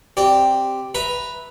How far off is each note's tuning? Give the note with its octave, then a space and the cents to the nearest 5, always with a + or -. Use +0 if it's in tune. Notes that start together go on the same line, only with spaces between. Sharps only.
C4 +0 G4 +0 D5 +0
B4 +0 E5 -10 A#5 +0